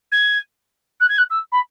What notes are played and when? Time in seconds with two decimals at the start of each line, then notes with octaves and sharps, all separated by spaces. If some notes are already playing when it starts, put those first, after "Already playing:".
0.12 G#6
1.00 F#6
1.09 G#6
1.18 F#6
1.30 E6
1.52 B5